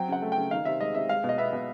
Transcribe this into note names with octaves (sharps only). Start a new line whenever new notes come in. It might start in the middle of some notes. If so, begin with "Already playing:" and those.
Already playing: F#3 C4 G5
C#3 F#5
A3
G5
C#3
D#3 F5
C3 E5
G#3 D#5
C3 E5
G#3 F5
B2
D#5
B3 E5
B2